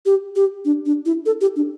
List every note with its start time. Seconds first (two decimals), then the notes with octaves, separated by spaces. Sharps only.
0.06 G4
0.36 G4
0.65 D4
0.86 D4
1.06 E4
1.26 A4
1.41 G4
1.56 D4